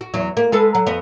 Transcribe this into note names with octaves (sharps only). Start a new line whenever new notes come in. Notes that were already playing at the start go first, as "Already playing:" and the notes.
F#4
E2 F#3
A#3
G#3 A4 B4
F#3
F2 B3